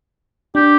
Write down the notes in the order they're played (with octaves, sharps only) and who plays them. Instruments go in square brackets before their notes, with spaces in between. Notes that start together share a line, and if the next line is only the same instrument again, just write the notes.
[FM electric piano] D4 [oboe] G4